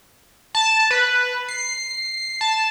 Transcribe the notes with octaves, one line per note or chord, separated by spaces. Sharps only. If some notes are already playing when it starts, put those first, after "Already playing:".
A5
B4
C7
A5